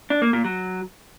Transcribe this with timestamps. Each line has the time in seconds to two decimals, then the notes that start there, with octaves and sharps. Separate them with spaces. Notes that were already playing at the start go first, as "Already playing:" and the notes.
0.10 D4
0.22 A#3
0.33 A#2
0.45 F#3